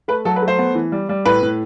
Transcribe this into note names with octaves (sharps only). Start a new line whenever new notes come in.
A3 B4
F#3 A4
B4
A3
C5
B3
E3
G3
G3
A2 B4
A2